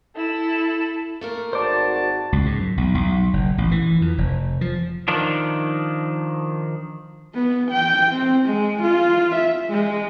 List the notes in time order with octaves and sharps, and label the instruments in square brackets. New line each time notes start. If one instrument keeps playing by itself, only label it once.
[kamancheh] E4 A4
[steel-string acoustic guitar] A3 A#3 A#4
[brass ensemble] G#1 F#4 A5 [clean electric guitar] C5 D5
[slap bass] C#2
G#2
F#2
B1
B1
F#1
A1
E3
F2
F1
F3
[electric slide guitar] D#3 F3 D4
[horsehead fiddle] B3
G5
C4
G#3
F4
E5
G#3